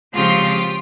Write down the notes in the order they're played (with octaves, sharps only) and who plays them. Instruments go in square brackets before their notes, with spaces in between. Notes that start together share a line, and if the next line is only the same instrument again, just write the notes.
[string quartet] C#3 F3 G#3 C4 F4 G4